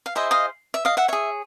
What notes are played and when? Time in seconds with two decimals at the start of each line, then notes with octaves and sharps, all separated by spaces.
0.06 F5
0.15 E4 G#4 C5 D#5 E5
0.31 D#5 F5
0.74 E5
0.85 D#5 F5
0.97 E5 F#5
1.08 G#4 C#5 E5